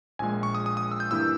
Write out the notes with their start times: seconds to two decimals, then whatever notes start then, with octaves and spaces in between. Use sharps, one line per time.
0.19 A#1 A#2 G#3 G#5
0.43 C#6
0.55 D#6
0.66 D#6
0.77 D#6
0.91 E6
1.00 G6
1.11 G2 E3 A#3 E4 E6